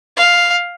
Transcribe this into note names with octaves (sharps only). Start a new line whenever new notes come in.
F5